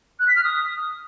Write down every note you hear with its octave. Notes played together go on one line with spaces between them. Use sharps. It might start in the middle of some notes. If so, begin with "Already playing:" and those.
F#6
B6
F6
D#6